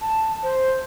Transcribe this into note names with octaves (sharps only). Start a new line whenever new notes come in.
A5
C5